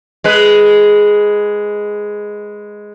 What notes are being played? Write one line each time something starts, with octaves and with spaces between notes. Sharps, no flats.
G#3 B4